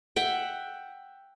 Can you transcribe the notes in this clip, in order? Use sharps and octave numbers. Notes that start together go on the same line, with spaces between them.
E5 F#5 G5